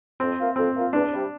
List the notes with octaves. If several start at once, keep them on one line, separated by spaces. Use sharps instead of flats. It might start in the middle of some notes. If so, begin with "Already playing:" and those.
F2 C4
E3 A#3 F4
F2 C4
E3 A#3 F4
E2 D4
C3 G3